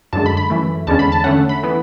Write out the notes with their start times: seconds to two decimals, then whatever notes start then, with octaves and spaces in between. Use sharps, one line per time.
0.13 F#2 D3 G#3 A5
0.26 B5
0.37 B5
0.50 F#2 E3 A3
0.87 E2 D3 G#3 C#4 A5
0.99 B5
1.12 A5
1.24 D3 A3 C#4 F#5
1.49 B5
1.63 E3 B3